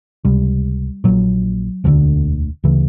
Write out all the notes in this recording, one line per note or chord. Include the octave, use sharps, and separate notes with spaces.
C#2 C3 G3
A#1 A#2 F#3
E1 D2 D3 F3
D2 C#3 E3